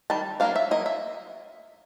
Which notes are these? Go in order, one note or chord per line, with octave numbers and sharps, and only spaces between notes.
D#3 G3 A5
F#3 A#3 D4 F5
E5
F#3 A#3 D#5
E5